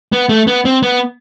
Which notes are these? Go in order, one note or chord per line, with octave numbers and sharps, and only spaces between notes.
B3
A3
B3
C4
B3